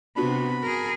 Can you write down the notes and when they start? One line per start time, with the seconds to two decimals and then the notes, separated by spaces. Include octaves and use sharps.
0.16 C3 B3 D4 F#4 B5
0.62 G#4 A#4